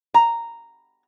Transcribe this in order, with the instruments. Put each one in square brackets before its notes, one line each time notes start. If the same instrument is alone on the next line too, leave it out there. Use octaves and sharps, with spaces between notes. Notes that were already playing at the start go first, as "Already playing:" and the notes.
[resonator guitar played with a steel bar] A#5